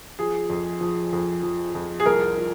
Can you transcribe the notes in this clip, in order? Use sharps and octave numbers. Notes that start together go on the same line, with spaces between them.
F3 G#4
F2
F3
F2
F3
F2
G#4
C2 A#4
F3